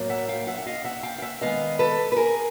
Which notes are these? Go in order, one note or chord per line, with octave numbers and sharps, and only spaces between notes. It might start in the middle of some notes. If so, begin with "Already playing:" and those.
Already playing: A2 F#3 A#3
E5 F#5
F5 G5
E5 F#5
F#5
D#5 F5
E5 F#5
F5 G5
F5
E5 F#5
D#3 G#3 B3 D#5 F5
A4 B4
B4
G#4 A#4